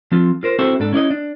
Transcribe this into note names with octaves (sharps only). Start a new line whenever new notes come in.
F3 C4 F4
F4 A#4 C5
C4 E4 F#4 A4 C5 A5
G#2 D4 A4
C#4 E4 D5 D#5
D4